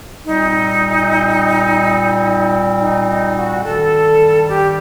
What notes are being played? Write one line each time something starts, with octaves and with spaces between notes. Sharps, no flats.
A#2 G3 C4 D#4
D#4
D#4
F#4
G2 D#3 G3 A4
G4